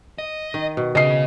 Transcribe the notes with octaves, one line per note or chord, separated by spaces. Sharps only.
D#5
D#3
B2
C#3 D#5 C7